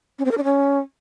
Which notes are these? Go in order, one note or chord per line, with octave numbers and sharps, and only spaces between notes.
C#4
C4
A#4
D4
C#4